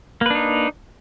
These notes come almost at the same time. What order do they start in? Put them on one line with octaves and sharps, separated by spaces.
A#3 B4 D4 D#4